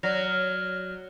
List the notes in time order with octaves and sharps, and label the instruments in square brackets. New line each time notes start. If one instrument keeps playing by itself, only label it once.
[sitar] F#3 [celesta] D5 A#6 F7 [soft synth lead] F6